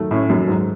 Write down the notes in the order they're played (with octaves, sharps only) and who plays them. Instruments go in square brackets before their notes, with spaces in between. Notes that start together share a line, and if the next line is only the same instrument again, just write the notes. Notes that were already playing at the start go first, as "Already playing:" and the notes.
Already playing: [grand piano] D#3 F#3 A3
[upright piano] A2 [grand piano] C#4
[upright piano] F#2 [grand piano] D#3
[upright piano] G#2 [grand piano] F#3